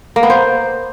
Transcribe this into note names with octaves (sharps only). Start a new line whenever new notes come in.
A#3
B3
C5